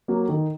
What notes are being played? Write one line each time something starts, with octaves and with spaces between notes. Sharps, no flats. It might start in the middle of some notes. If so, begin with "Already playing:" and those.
F#3 A#3
D#3